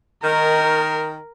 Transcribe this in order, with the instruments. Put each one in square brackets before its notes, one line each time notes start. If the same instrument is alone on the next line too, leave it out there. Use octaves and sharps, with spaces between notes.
[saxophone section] D#3 [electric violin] A#4